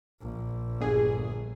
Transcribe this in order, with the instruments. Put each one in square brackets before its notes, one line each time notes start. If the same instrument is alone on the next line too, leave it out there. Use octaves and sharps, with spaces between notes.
[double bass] A#1
[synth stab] G1 G#4